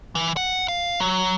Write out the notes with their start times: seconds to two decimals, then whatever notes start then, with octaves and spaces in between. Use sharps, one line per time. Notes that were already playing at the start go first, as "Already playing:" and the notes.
0.15 E3
0.37 F#5
0.68 F5
1.00 F#3